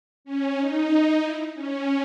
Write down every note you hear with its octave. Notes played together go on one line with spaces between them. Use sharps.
C#4
D#4
E4
C#4